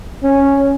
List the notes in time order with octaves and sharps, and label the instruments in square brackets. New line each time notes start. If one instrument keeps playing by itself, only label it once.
[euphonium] C#4